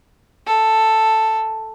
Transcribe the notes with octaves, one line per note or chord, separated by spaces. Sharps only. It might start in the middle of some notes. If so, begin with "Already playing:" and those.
A4